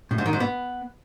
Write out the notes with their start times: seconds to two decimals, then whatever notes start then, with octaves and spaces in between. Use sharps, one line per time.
0.11 A2
0.18 G#2
0.26 D#3
0.33 G#2
0.40 B3